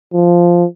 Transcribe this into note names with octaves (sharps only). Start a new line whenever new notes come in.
F3